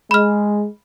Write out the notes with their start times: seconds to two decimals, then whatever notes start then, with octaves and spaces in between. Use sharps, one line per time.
0.11 G#3 B5 F6